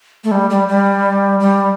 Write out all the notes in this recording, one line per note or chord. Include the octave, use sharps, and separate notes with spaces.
A3
G3
G3
G3
G3